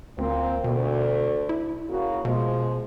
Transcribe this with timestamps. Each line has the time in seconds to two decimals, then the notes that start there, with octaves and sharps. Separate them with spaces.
0.18 D2 A#2 A#3 C4
0.64 D2 B2
1.49 E4
1.89 C#3 A#3 F#4
2.25 B2 F3 G#3